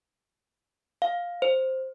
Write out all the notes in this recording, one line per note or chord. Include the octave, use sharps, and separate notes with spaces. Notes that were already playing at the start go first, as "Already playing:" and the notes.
F5
C5